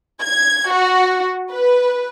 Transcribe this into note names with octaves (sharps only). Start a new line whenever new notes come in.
G#6
F#4
B4